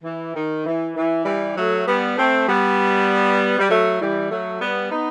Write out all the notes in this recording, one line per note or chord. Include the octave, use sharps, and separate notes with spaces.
E3
D#3
E3
E3
E3 G3
F#3 A3
G3 B3
A3 C4
G3 B3
G3
F#3 A3
E3 G3
F#3 A3
G3 B3
B3 D#4